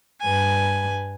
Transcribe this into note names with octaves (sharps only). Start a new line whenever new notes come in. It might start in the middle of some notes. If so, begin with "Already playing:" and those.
G2 B4 G#5